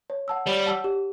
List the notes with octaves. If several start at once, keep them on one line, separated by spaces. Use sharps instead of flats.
C#5
F#5 A5 E6
G3 C#5
F#5 A5 E6
G4